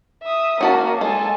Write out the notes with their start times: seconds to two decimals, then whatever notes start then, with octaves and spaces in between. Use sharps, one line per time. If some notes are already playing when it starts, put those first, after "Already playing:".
0.23 E5 D#6
0.61 A#3 C#4 F#4 A5
1.01 G#3 A4 G#5